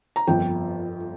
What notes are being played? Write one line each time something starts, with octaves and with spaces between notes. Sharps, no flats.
A#5
G1 F2 F3 G5